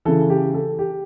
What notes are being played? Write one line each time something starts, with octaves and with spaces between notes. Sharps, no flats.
C#3 E3 A4
G4
A4
G4